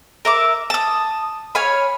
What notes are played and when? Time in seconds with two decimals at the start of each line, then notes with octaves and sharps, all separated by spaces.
0.25 A#4 E5 D6
0.70 A5 D#6
1.55 C#5 F5 G#5 B5